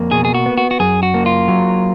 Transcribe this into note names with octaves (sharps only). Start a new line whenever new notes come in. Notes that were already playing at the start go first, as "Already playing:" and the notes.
Already playing: F2 A#3
B2 G#4
G#4
F#4
B3
F#4
F#4
F#2 G#4
F#4
A#3
F4
F#3